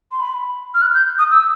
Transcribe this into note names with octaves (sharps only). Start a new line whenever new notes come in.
C6
B5
F6
F#6
G6
D#6
E6